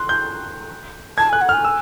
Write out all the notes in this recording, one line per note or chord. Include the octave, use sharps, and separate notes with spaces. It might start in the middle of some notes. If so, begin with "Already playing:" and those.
Already playing: C6 F#6
G6
A5 G#6
G#5 F#6
F#5
G#5 F6
E6